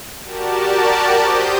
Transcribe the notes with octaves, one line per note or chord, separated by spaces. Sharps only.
F#4 G4 A#4 D5 A5
G4 C5 D#6 G6